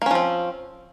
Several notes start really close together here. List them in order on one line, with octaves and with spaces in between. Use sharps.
A#3 C#4 F3 C4